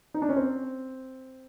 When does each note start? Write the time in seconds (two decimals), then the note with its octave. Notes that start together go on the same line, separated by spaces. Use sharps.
0.14 D#4
0.22 D4
0.29 C#4
0.36 C4